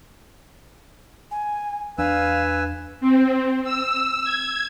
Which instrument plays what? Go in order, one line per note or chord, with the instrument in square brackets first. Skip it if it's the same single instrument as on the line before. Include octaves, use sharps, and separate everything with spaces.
[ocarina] G#5
[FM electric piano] E2 D4 [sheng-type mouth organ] B4 G#5 E6 [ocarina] F5
[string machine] C4
E6
G#6